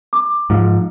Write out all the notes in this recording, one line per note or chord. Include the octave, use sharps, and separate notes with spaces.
D6
G#2 F3